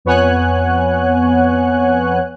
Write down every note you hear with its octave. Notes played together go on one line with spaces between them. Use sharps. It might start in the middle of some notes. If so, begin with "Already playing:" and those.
F2 B3 C#5 F#5 G#5 F#6